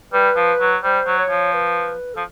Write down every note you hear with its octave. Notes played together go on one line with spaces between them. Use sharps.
G3 B4
F3
F#3
G3 C5
F#3
C#5
F3
B4
F3 A4